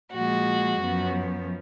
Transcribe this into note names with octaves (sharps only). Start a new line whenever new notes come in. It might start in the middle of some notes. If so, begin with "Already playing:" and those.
A#2 F3 G#3 F#4
F#2 F3 B3